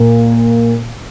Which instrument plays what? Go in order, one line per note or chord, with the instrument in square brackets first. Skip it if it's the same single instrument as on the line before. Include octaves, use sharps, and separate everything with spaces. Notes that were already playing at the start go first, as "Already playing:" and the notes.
Already playing: [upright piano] A#2